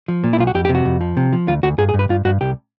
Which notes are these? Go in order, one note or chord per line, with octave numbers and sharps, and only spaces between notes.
F3
A#2
E4
B1 F4
F#4
F2 G4
G4
C3
F#4
F2
F3
C3
F3
D2 F4
D2 F#4
G2 G#4
G#4
G2
B4
G2 F4
G2 F#4
C2 G4